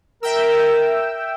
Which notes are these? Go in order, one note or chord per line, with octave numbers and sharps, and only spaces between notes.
A#4 E5 G5 E6